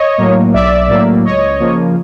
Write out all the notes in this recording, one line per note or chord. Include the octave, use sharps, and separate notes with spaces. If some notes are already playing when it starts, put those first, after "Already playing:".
Already playing: C#5 D#5
A2 F#3 A#3
B1 D5 E5
A2 F#3 A#3
C#2 C#5 D#5
C#3 F3 A#3